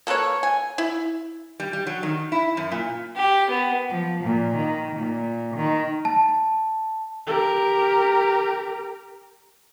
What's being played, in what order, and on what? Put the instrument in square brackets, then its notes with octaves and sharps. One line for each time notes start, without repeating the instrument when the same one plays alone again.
[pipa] A#3 A4 B4 C#5
G#5
E4
[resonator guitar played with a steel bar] G3
G3
F#3
D#3
E4
F#2
A#2
[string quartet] G4
B3
F3
A#2
D#3
A#2
D#3
[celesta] A5
[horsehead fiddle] G4 A#4